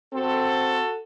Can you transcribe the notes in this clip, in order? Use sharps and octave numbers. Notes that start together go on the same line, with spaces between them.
C4 F#4 A4